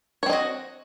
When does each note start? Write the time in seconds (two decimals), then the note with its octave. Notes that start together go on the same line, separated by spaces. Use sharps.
0.23 C#5
0.26 C4
0.30 D#5
0.33 F#4